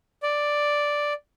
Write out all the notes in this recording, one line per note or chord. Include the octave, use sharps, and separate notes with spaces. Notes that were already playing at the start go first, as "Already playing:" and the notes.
D5